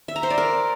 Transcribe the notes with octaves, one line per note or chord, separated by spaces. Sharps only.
E5
A#5
C5
D5
A#4